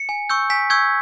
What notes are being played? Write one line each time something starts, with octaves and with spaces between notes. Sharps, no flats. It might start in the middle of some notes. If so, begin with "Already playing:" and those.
Already playing: C#7
G#5
C#6 E6 G6
G#5 B6
C#6 E6 G6 G#6